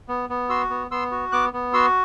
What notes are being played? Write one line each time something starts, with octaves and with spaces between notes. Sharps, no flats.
B3
B3
F#4 C6 E6
B3
B3 C6 E6
F#4
B3 D6 F#6
B3
F#4 C6 E6